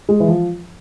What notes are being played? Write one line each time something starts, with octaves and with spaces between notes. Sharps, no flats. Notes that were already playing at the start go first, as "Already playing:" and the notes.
G#3
E3
F3